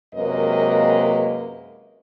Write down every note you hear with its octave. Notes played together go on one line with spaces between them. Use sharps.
F#2 C3 G#3 A#3 B4 D#5